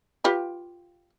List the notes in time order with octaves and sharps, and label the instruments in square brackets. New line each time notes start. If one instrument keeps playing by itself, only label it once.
[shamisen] F4 G4 B4